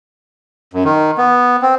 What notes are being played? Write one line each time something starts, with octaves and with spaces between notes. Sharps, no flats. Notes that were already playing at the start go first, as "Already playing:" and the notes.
F#2
D#3
B3
C4